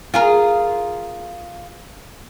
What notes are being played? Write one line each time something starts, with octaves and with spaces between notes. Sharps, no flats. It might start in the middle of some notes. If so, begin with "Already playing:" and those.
F4 G#4 A#4